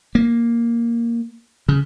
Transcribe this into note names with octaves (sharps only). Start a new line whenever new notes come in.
A#3
C#3